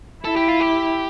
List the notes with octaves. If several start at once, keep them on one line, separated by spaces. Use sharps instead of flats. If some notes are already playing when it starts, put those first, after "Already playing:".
E4 A4
G4
F4
G4